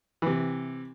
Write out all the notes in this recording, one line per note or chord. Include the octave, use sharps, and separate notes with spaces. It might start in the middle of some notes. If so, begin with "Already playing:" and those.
C3 E3